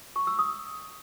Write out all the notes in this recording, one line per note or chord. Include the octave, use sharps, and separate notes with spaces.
C#6
E6
D#6